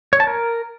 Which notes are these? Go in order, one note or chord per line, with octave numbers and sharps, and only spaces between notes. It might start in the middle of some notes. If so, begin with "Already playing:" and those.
C#5
A5
A#4